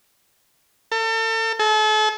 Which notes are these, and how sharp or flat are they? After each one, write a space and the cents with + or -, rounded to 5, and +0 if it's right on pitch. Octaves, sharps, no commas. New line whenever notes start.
A4 +35
A4 -40